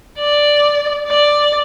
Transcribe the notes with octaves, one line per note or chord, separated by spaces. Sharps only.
D5
D5